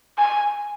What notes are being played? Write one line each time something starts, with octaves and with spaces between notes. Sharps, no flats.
G#5